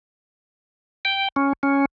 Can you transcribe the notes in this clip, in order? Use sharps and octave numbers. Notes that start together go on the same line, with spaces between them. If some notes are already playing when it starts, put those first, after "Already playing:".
G5
C#4
C#4